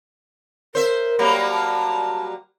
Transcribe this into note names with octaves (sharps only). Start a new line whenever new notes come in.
A#4 C5 E5
F#3 G3 A#3
A5